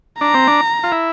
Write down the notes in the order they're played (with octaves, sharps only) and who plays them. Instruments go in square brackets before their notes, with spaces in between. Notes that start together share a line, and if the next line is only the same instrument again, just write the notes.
[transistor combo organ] D4 [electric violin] A#5
[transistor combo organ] C4
D4
F4
E4